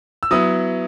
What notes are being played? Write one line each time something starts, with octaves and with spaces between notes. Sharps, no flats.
E6
F#3 B3 E4 D#6